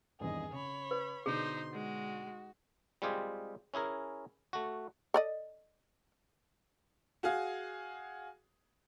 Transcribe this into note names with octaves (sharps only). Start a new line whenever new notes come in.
G#1 E2 G2 G#4 D#5
C#3 C#5 B5
B4
B2 D3 D#4 G#4 C5 C6
G#3 F#4
G3 G#3 C4 F4 G4 G#4
C#4 E4 G#4 A#4
A3 F#4
A4 D5 D#5
F#4 G#4 F5